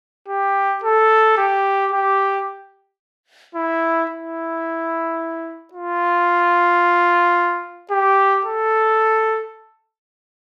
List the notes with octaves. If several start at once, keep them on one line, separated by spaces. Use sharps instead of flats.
G4
A4
G4
G4
E4
E4
F4
G4
A4